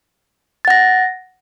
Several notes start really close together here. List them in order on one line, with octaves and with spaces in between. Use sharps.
A6 F#5 A#6